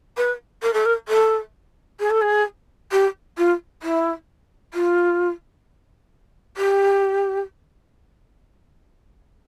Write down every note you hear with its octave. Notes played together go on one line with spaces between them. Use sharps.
B4
A#4
A4
A#4
A4
G#4
A4
G#4
G4
F4
E4
F4
G4